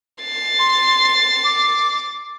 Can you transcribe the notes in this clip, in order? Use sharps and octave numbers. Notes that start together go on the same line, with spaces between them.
A6 C7
C6
D6